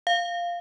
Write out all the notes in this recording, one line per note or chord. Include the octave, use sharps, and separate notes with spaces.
F5